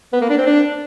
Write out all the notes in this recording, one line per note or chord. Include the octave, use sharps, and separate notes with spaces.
B3
A#3
D4
C4
D4